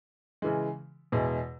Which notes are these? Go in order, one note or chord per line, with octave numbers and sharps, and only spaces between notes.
C#3 E3 G#3
E2 B2 G#3